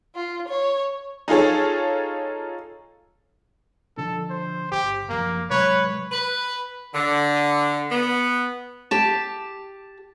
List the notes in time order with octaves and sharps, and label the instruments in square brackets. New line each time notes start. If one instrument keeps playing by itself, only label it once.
[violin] F4
C#5
[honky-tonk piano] D#4 F4 G#4 A4 C#5
[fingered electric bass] D3 F3 D4 [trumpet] A4
[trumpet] C5
[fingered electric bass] G1 [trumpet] G4
[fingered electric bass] F#1 F3 [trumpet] A#3
[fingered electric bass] C3 F#3 G#3 [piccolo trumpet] B4 [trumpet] C#5
[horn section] B4
D3
B3
[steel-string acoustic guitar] G4 A5